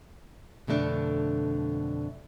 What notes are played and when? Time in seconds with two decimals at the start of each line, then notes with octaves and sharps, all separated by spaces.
0.67 F2 B2 D3 A3 D4